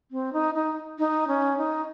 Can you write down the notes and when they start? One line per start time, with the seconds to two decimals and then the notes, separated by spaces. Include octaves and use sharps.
0.11 C4
0.33 D#4
0.55 D#4
0.99 D#4
1.28 C#4
1.57 D#4